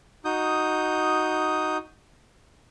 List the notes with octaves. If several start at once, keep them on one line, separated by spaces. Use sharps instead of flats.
D#4 F#4 D#6 G6